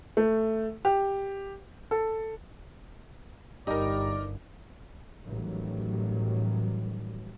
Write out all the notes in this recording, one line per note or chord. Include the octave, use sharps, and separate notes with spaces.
A3
G4
A4
G1 G3 D#4 A#4 D5
A1 D#3 F#3 G3